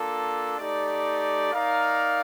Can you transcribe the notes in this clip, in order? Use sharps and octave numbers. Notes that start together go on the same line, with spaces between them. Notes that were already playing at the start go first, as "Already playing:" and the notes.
Already playing: A#3 D4 F4 A4
A3 D#4 G4 D5
D#4 A#4 D5 F5